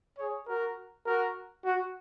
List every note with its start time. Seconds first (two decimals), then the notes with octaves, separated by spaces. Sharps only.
0.19 G#4 C#5
0.48 F#4 A#4
1.06 F#4 A#4
1.65 F#4